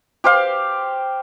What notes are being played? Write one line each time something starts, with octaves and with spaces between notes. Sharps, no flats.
G4 C5 F5